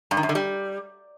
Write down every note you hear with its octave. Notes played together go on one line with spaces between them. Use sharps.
G2
D#3
F#2
D3
G3